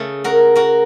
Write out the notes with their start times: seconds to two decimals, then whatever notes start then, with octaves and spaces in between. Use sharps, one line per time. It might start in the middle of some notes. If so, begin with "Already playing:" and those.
Already playing: C#3 A3
0.24 F#4 A#4
0.55 F#4 A#4